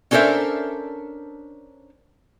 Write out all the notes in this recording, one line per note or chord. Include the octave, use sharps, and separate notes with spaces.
C#4 D4 A4 A#4 C5 E5